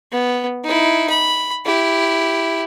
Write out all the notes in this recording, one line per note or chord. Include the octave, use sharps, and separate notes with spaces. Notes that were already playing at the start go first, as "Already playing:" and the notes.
B3
D#4 E4
B5
E4 G4